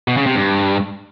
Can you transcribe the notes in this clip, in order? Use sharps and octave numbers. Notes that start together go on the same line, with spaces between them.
B2
C#3
C3
G2